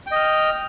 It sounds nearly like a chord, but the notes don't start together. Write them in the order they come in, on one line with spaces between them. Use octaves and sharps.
G5 D#5 F6